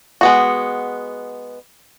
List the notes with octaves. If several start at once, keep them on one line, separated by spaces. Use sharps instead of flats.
G#3 B3 F#4